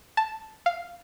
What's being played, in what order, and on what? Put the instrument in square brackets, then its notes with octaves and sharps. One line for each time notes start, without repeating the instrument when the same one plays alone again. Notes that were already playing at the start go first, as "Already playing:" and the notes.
[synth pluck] A5
F5